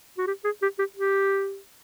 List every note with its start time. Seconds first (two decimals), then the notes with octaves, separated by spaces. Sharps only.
0.18 F#4
0.27 G4
0.44 G#4
0.62 G4
0.79 G4
0.96 G4